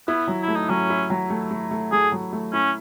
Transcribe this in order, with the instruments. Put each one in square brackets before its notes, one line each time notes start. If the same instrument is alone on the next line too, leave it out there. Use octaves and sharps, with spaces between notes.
[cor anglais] B3 [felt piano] E4
[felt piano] F#3
[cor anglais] E4
[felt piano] A3
[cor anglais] D#4
[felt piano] F#3 [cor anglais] C#4
[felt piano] E4
F#3
A3
A3
A3
[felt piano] A3 [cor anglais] G#4
[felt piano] F#3
A3
[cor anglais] C#4 [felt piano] E4